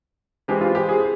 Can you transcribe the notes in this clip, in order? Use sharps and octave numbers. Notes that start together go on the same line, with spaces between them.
E3 G#3 C4 G4
F4
G4
G#4